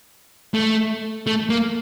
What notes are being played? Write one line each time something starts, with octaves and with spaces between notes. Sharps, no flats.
A3
A3
A#3